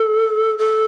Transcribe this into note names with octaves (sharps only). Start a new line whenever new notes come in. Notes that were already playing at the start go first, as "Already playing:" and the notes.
Already playing: A4
A4